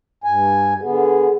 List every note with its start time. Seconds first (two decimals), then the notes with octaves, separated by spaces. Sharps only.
0.24 G2 G#5
0.82 D3 B3 G#4